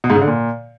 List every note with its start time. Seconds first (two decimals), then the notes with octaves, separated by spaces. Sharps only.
0.04 B2
0.10 G#2
0.16 C#3
0.22 D3
0.27 A#2